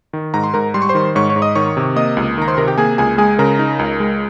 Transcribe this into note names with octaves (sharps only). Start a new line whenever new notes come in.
D#3
G#2 A#5
C6
G#2 A#4 A#5
G3 C6
C#6
C5 C6
D#3
G#2 C#5 C#6
C#5 C#6
G#2
D#5 D#6
D#3 C#5 C#6
C3
A#3 D#5 D#6
C#2
D#3 A#5
C5 C6
C3 A#4 A#5
G4 G5
A#3 G#4 G#5
C#2 G#4 G#5
G#3 G#4 G#5
C#3 A#4 A#5
D#4
C#2
G#3